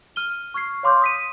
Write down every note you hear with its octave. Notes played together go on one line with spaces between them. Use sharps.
F6 D#7 G7
C#6 F6 G#6 C7
C#5 F5 C6 D6 F6 G6
D#6 B6 D#7